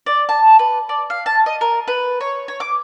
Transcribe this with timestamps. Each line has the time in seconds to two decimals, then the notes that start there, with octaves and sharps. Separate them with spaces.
0.06 D5
0.29 A5
0.59 B4
0.89 D5
1.10 F5
1.26 A5
1.46 D#5
1.61 A#4
1.88 B4
2.21 C#5
2.48 C#5
2.60 D6